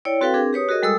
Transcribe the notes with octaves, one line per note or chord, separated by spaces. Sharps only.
E4 C#5 D5 G5
C4 F#4 A4 B4 F5 G5
C4 D4 G#4 A#4
G4 B4 C#5 D#6
F#4 G#4 A#4 D#5
G3 G#3 A4 D#6 E6